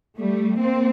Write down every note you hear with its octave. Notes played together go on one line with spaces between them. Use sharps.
G3 A3
A#3 C4